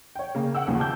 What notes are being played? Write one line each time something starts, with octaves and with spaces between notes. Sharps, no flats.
C#5 G5
C#3 A#3
F#5 G5 E6
A1 D#2 A#2 C#3 F3
A5 D6 G6